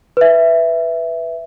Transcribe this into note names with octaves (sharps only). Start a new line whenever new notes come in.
B4 E5